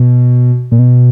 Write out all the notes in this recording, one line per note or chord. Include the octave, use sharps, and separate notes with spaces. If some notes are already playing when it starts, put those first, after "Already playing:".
Already playing: B2
A#2
B2